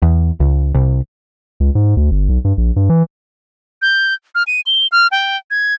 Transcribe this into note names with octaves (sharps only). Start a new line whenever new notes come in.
E2
C#2
C2
C#2
G#2
D2
G1
B1
G2
A#1
G2
E3
G6
F6
D#7
G7
F6
G5
G#6